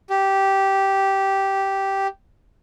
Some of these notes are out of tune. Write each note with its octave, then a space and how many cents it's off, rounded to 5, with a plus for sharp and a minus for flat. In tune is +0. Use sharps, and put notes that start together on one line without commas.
G4 -10